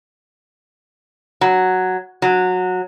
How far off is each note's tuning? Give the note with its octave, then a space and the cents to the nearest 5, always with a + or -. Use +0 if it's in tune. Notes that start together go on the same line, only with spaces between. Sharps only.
F#3 +0
F#3 -15